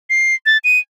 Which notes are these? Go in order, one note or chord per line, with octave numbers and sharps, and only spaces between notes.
C7
A6
D#7